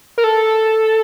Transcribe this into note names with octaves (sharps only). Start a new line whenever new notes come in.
A#4
A4